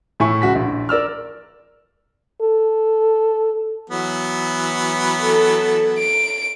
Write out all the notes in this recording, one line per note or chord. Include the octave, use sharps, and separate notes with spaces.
A2 E4 G#5 C#6
C#2 F#4 B6
A#1
A#4 D5 E6 F6
A4
E3 F#3 B3
A4
D7